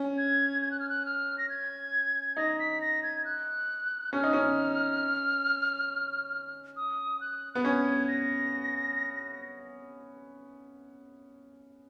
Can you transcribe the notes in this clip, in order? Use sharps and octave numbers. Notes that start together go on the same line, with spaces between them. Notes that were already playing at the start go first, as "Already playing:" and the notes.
Already playing: C#4
G#6
G#6
F#6
F6
F#6
F6
A#6
G#6
D#4 A#6
B6
A#6
G#6
F#6
C#4 F6
D#4
C#4
D#6
F#6
B3 F#6
C#4 G#6
A#6